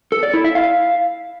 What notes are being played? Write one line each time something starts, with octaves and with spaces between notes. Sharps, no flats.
A4
D5
E4
E5
F5